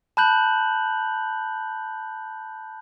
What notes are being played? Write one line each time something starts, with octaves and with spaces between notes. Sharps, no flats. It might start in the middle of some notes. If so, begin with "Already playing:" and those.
A5 B5 F#6 G6 F#7